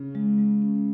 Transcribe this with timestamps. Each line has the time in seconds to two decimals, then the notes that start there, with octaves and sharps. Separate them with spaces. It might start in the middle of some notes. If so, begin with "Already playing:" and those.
Already playing: C#3
0.15 G#3
0.38 G#3
0.62 C#4